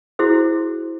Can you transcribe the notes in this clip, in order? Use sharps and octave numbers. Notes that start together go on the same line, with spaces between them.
E4 F#4 G#4 C5